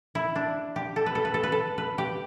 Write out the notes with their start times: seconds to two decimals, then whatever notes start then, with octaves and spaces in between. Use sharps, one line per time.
0.15 E4
0.36 D4
0.76 G4
0.96 A4
1.06 B4
1.15 A4
1.25 B4
1.34 A4
1.43 B4
1.52 A4
1.78 B4
1.98 G4